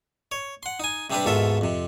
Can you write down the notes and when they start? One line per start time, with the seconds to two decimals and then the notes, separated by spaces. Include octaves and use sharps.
0.32 C#5
0.63 F#5 C6
0.80 D#4 G#5
1.10 C3 G3 C4 D4 G4 B4
1.25 D#2 G#2 B2 F4 A4 E5
1.61 F2 C3